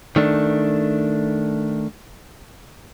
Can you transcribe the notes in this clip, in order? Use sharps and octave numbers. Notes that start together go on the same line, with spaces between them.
D#3 A3 D4